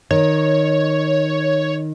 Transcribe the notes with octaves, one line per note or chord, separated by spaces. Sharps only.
D#3 C#5